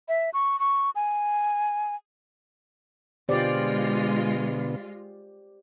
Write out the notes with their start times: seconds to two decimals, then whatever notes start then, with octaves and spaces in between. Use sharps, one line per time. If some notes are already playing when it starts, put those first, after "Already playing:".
0.08 E5
0.33 C#6
0.59 C#6
0.95 G#5
3.29 B2 D3 G#3 B3 F4 G4 C5 D5